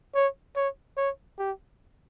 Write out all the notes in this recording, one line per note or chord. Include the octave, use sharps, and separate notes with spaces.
C#5
C#5
C#5
G4